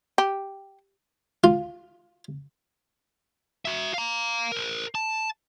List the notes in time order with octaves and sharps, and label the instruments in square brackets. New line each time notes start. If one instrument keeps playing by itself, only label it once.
[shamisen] G4
[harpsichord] F4
[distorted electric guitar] F#4 E5
F5 A#5
A#4 C5
A5